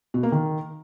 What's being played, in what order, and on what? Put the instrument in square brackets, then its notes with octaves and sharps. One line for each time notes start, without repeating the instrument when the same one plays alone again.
[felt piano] B2
A#3
D#3